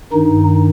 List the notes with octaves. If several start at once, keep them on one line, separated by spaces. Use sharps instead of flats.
G2 D#3 D#4